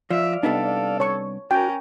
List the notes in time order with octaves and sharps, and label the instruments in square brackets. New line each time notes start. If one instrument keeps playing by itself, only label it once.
[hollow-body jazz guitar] F3 [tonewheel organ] D5 F5 [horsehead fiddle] E5
[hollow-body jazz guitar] C2 B3 D4 [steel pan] D#4 G4 [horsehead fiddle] A4
[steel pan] C#5 A5 C#6
[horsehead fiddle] C#4 A#4 [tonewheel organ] F#4 [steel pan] G5